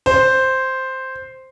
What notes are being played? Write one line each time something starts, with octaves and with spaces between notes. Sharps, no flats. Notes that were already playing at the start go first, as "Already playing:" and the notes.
C5